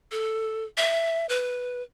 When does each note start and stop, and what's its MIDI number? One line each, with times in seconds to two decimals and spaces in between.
0.11 0.64 69
0.77 1.26 76
1.29 1.82 71